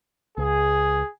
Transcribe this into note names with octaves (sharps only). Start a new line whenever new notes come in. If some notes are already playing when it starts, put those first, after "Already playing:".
C#2 G#4